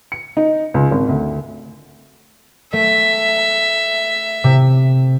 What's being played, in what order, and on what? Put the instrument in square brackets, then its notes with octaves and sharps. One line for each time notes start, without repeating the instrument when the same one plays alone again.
[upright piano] C#7
D#4
C#2
G#1
D2
[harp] A3 [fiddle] E5
[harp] C3